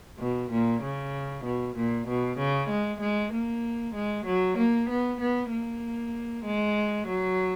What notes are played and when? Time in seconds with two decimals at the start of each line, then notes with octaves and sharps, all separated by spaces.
0.20 B2
0.51 A#2
0.83 C#3
1.45 B2
1.76 A#2
2.08 B2
2.38 C#3
2.70 G#3
3.01 G#3
3.33 A#3
3.95 G#3
4.26 F#3
4.58 A#3
4.89 B3
5.21 B3
5.51 A#3
6.46 G#3
7.07 F#3